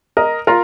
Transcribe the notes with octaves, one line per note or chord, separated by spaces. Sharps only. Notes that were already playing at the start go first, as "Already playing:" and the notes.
A#4 D#5
F4 A#4